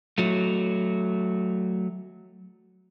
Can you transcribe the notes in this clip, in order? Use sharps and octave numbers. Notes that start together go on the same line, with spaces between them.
F#3 A3